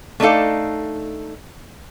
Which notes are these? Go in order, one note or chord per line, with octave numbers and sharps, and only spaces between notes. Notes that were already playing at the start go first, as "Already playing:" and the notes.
A3 A#3 D4 D#4 A4 F5